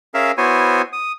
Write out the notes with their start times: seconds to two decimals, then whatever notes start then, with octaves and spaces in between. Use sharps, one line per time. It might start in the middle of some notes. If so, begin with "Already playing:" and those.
0.14 C#4 G#4 A#4 E5 F5
0.38 B3 E4 F#4 C5 C#5 G#5
0.93 D#6